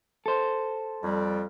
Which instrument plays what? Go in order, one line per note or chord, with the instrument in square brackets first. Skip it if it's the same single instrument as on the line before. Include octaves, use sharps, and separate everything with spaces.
[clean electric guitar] A4 C5
[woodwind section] F2 G3